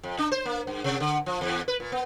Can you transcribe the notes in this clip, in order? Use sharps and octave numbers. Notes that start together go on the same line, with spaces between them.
F2
D4
C5
A#3
G2
C3
D3
F3
E2
B4
A#2
B3